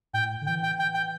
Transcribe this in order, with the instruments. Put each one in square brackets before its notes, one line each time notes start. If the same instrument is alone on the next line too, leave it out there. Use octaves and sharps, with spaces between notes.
[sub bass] A2 [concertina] G5
[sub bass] D3
[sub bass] E3 [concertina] G5
[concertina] G5
G5
G5